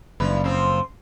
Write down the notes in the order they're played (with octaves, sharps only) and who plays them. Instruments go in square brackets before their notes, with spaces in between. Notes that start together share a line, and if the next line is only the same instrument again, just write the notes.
[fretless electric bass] F#1 [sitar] G2 E3 B4
[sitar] F#2 F3 C4